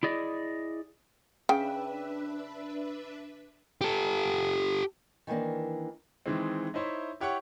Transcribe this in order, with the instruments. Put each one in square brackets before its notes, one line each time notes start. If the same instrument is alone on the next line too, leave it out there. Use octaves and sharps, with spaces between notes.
[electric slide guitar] E4 G#4 D5 D#5
[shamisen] C#3 [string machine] D4 B4 E5 [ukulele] G5
[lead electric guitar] G4 A4
[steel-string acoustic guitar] D#3 E3 A3 A#3 D4
[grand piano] D#3 E3 G#3 C4
D#4 E4 C5 C#5 E5
E4 G4 C#5 F#5 C#6